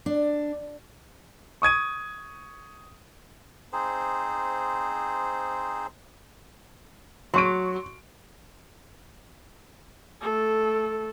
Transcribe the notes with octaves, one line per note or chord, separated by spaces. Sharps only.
D4
C#6 D#6 G#6 D#7
C4 D#4 G#4 C5
F#3 C6 C#6 D7
A3 A4